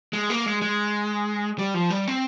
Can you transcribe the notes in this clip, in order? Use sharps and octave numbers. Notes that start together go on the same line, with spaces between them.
G#3
A#3
G#3
G#3
G3
F3
G3
C4